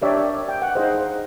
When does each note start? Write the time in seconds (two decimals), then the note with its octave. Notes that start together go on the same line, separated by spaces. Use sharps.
0.02 D4 G4 A#4 C#5 D5 E5
0.49 G5
0.62 F#5
0.75 D#4 G#4 C5 D#5 F5